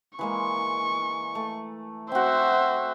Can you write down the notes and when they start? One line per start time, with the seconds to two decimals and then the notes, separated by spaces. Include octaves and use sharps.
0.19 E3 G#3 A#3 C#6
1.35 A3
2.12 C4 F#4 C5 E5